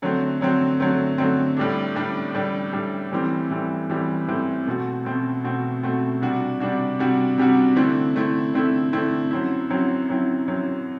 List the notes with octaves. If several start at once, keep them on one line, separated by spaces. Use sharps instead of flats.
D3 F#3 A3 C4
D3 F#3 A3 C4
D3 F#3 A3 C4
D3 F#3 A3 C4
A2 G3 D4
A2 G3 D4
A2 G3 D4
A2 G3 D4
A2 E3 G3 C4
A2 E3 G3 C4
A2 E3 G3 C4
A2 E3 G3 C4
B2 A3 C4 F#4
B2 A3 C4 F#4
B2 A3 C4 F#4
B2 A3 C4 F#4
C3 G3 D4 F#4
C3 G3 D4 F#4
C3 G3 D4 F#4
C3 G3 D4 F#4
D3 A3 C4 E4
D3 A3 C4 E4
D3 A3 C4 E4
D3 A3 C4 E4
F#2 F#3 C4 E4
F#2 F#3 C4 E4
F#2 F#3 C4 E4
F#2 F#3 C4 E4